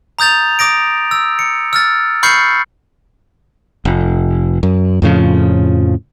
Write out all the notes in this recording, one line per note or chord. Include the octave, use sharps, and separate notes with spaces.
A#5 D#6 G6 A6 F7
D6 D#6 A#6 D7
E6
C#7
E6 F6 A6
B5 C#6 F6 G6 C7 C#7
F1
F#2
F2 A2 C#3 F3